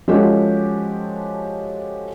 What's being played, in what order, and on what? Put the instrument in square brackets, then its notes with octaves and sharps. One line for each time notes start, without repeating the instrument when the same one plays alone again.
[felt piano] F3 G#3 C#4 F#4 G4 A4